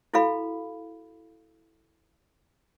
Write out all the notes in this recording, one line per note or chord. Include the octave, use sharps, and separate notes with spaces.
E4 F#4 A4 F5 B5